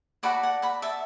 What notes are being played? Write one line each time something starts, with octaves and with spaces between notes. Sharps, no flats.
F#4 A4 D5 F#5 B5
F#5
F#5 B5
E5 A5